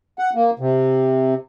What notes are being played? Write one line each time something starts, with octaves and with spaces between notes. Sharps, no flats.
F#5
A#3
C3